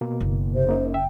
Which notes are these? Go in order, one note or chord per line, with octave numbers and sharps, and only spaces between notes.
B2 A#3
F#1
C3 C5
F#2 C#3 A#3 D#4
E5 G5